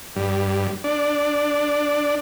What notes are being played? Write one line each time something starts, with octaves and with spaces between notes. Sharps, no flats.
G2
D4